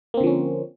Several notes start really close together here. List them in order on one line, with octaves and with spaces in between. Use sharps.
A#3 C4 D3 F3 C#4